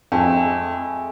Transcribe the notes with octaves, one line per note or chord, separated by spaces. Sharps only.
F2 G#3 A3 E5